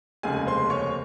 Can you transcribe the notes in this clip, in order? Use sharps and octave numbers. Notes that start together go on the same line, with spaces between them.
F1 D#2 C#3 G#3 G#4 G#5
C5 C6
C#5 C#6